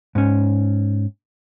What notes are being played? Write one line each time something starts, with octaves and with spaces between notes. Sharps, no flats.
G#2 C#4